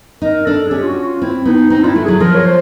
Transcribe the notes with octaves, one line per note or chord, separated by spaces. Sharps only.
D#4 A#4
D4 A4
G#4
C#4 G4
F4
F#4
F4
C4 E4
B3 D#4
C4 D#4
D4 E4 F4
A3
F#3 G#4
F3 A#4
C#5
C5